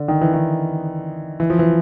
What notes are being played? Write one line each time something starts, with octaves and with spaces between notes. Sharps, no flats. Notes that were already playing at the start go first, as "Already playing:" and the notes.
Already playing: D3
D#3
E3
D#3
E3
F3
E3